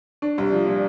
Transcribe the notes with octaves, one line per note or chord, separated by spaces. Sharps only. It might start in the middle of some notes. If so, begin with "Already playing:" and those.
D4
C2
F3
A#2